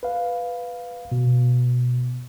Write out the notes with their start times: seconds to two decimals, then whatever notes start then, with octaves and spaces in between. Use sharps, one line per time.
0.03 B4 F5
1.12 B2